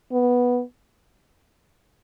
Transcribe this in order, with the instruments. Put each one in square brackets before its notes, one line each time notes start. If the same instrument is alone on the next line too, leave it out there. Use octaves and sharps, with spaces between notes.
[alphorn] B3